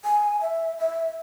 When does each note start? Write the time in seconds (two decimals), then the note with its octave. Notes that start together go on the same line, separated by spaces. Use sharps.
0.04 G#5
0.41 E5
0.79 E5